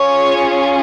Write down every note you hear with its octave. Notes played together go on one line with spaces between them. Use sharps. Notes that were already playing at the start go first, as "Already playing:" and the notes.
Already playing: C#4 F4 G#4 C#5